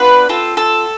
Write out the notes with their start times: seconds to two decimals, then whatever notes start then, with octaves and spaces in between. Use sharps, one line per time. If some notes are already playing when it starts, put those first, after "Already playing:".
Already playing: B3 D4 F4 B4
0.29 C4 F4 A4
0.57 A4